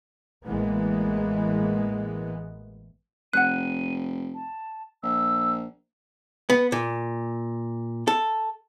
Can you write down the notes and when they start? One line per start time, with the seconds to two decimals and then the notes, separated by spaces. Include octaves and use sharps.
0.46 A1 E3 G#3 A#3 B3
3.33 F1 F#5 F#6 D#7
4.34 A5
5.03 A#1 E6
6.50 B3
6.72 A#2
8.08 A4